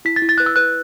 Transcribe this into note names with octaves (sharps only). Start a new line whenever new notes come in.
E4 B6
A6
E4
A6
B4 F#6
E6
B4 F#6